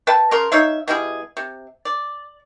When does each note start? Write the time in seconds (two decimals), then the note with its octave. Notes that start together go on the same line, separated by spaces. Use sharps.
0.07 B4 E5 G5 A5
0.31 C#3 A#4 C6
0.52 D#4 C#5 E5 F5
0.88 B2 G3 E4 G#4
1.37 C3
1.85 D5